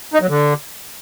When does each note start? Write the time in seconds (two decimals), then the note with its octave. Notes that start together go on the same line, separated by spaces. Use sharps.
0.14 D#4
0.21 F#3
0.29 D3